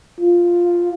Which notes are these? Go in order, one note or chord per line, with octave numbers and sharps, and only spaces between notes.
F4